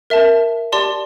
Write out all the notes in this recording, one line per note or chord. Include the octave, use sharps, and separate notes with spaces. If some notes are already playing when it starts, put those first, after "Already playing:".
A#4 E5 A5
G4 D5 A5 C6